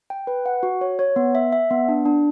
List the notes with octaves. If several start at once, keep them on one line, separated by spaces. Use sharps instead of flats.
G5
B4
F#5
F#4
C#5
C#5
B3
E5
E5
B3
D4
D4